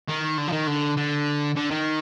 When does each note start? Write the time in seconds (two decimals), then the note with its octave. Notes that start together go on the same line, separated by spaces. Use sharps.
0.08 D#3
0.38 D3
0.47 F3
0.52 D#3
0.67 D3
0.97 D3
1.56 D3
1.71 D#3